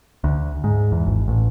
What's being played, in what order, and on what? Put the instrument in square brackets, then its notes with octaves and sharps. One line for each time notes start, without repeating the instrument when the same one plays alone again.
[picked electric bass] D2
G#2
E2
G#1
A1